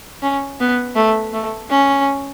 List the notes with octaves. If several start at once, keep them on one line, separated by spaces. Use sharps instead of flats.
C#4
B3
A3
A3
C#4